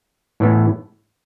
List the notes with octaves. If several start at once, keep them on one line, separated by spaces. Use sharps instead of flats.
A2 E3 B3